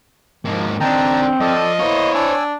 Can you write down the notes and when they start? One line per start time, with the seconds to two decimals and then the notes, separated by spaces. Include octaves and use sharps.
0.45 G#2 F3 A#3
0.80 D#3 C4 D4 G5 A5 A#5
1.41 F3 A4 D5 D#5
1.79 A#3 B3 E4 C5 C#5
2.14 D4 G#5 E6